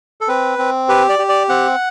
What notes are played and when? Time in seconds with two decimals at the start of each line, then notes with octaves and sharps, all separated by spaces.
0.21 A4
0.28 C4 B4
0.59 C4
0.89 G4 B4
1.09 D5
1.19 G4
1.29 D5
1.49 C4 F#5